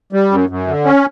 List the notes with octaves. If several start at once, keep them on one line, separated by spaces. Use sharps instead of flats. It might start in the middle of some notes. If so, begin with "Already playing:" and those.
G3
F#2
F#2
D3
C#4